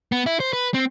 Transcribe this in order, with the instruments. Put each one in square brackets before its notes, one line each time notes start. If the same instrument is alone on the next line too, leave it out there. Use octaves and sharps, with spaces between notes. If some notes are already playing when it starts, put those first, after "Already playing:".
[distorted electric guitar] B3
E4
C5
B4
C4